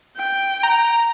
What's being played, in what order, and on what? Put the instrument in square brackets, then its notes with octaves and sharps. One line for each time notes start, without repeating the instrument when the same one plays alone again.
[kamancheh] G5
[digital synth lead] A#5